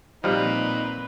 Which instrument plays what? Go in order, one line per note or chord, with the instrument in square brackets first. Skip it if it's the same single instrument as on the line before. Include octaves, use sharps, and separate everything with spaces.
[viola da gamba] A#2 C4 [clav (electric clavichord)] F3 G3 [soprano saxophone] D#4 [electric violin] B4